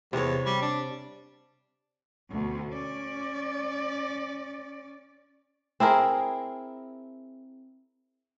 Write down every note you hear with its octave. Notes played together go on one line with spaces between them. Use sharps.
E2 C3 C#5
G3
D4
D2 B2
C#4 D5
C4 E4 G#4 A#4